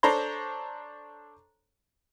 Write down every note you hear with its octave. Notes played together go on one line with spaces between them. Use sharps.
D4 A4 C5 C#5 A#5 C6